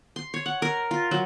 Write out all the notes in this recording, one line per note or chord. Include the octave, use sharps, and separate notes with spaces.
C6
C#5
F#5
A#4
F4
F#3